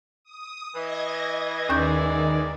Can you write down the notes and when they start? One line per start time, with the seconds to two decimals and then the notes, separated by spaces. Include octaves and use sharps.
0.24 D#6
0.75 E3 D#5 G#6 A#6
1.69 D#2 D#3 G#3 C#4 G#4 D5 G6